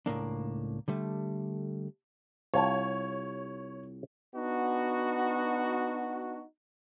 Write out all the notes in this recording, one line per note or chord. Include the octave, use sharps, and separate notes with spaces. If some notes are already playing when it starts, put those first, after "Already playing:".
C#2 A2 A#3 D4
D3 G3 A3
C2 F4 C#5 A5
B3 D4 D#4 F#4